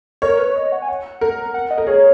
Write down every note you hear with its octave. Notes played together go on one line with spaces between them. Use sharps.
A#4 C#5
B4
D#5
F#5
G#5
F#5
A#4
F#5
D#5
A#4
G#4 C#5